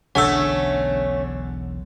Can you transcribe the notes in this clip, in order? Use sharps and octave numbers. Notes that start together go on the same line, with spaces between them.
E1 B1 D3 A3 C#4 F#5 E6